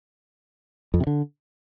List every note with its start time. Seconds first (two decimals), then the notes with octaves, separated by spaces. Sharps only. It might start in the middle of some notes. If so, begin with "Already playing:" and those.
0.94 F2
1.00 C3
1.07 D3